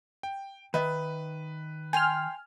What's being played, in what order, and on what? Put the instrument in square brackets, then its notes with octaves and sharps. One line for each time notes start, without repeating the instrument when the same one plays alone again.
[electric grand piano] G5
[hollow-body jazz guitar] D#3 E5 [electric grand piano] B4
[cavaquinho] G5 C6 [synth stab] G#5 F6